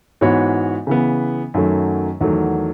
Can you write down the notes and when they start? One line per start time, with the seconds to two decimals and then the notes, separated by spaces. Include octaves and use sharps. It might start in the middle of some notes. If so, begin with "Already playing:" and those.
0.21 G#2 E3 B3 F#4 C#5
0.87 C#3 E3 B3
1.54 F#2 D#3 F#3 A3
2.21 E2 D#3 F#3 A3